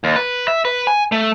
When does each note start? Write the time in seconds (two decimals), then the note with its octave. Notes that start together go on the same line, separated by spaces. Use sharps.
0.04 D#2
0.16 B4
0.48 E5
0.65 B4
0.87 G#5
1.12 A3